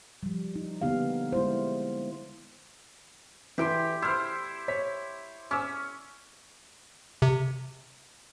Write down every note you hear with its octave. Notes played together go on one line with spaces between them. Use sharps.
F3 G3
D#4
D3 A#3 B3 D#4 G4 F5
G#3 E4 C5
E3 E4 G4 G5 C6 D7
E4 C5 C6 F6
C#5 B6
C#4 D6 E6
C3